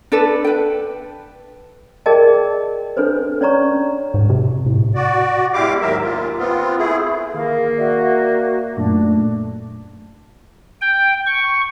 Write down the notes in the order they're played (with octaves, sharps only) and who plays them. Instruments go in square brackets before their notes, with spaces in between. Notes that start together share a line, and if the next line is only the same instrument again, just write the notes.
[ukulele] D4 A4 B4
B4 G5
[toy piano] G#4 A#4 D5 D#5 G5 A5
D4 A4 B4 C5
C#4 C#5 D5 A#5 C#6
[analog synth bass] G#2
C3
A2
[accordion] F#4 D5
E2 G#3 E4 G4 F5 D6
D#2 G#2 F#3 A#4 E5
D#2 A#2 F4
B3 C4 F4
A3 E4 G#4
[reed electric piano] D#3 G#4 [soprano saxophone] A#3 [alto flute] F5
[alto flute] F#4 [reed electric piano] D5 E5 F#5
[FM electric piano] F#2 A#2 [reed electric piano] A3 [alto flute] D4
[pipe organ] G5
C#6